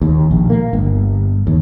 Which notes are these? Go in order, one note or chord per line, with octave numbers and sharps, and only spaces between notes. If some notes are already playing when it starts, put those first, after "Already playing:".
D#2
A#1
A#3
G1
D#2